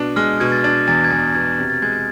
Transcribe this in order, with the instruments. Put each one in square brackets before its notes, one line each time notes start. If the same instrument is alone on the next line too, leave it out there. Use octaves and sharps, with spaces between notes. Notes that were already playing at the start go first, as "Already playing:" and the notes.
Already playing: [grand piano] B2 D4
[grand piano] G#3 [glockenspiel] F6
[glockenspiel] F6
[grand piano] B2 [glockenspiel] G#6
[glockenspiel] A6
[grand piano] D4 [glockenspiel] A6
[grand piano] E2 [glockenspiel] A6
[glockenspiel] G#6
[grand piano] E2 [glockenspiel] A6
[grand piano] B2 [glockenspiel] G#6
[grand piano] C3
[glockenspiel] A6
[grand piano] G#3 [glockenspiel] G#6
[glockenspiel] G#6